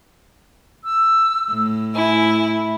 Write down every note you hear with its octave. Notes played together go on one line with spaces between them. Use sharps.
E6
A2
E4 G#5